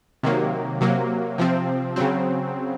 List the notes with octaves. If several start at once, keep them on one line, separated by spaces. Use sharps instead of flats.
C3 D#3 F#3 A#3
C3 F#3 A#3
C3 F3 C4
C#3 F#3 C4